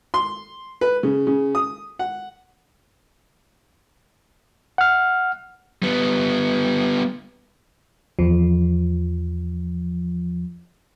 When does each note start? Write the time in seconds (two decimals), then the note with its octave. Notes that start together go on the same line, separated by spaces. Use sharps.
0.14 C6
0.81 B4
1.03 C#3
1.27 C#3
1.55 D#6
1.99 F#5
4.78 F#5 F6
5.82 G3 B3
8.19 E2 F3